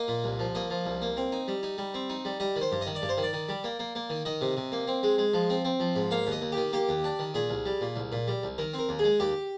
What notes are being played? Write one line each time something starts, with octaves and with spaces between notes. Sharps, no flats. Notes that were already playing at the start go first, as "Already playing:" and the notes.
Already playing: A#3 D#5
A#2
C2
F3
A#3 D#5
F3
C2
A#3
C4
D#4
G3
D#4
G3
C4
D#4
G3
G3 D#5
D#3
C5
G2
D#5
D#3
D5
G2
C5
D#3
D5
D#3
G3
A#3
A#3
A#3
D#3
D#3 D#5
C3
C3
A#3
C4
G#3
G#3
F3
C4
C4
F3
G#2
A#3 F5
D#2
D#5
D#2
D#3 G4
A#3 G4
D#2
D4
D#3
A#2 G#4
C2
G3
A#2
C2
A#2
G3
C2
D#3 A#4
C4
A#4
D#2
G#4
G#3
D#2 G4